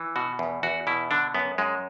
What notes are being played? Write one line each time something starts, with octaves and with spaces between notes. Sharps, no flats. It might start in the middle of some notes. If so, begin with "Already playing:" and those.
Already playing: E3
B2 F#4
E2
E2 F#4
B2 E4
D3 D4
F#2 B3
F#2 G#3